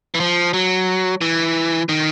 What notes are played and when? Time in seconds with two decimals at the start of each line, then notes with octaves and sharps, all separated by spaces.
0.15 E3
0.20 F3
0.54 F#3
1.21 E3
1.89 D#3